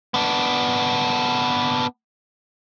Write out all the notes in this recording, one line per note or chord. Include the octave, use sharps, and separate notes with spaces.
B3 D4